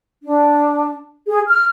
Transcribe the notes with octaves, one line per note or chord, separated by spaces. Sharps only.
D4
G#4
F6